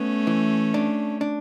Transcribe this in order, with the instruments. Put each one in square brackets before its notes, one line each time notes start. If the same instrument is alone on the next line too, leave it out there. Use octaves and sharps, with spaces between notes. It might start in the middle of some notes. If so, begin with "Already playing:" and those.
Already playing: [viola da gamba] A3 C#4 [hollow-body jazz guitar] B3
[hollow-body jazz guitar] E3
D4
D4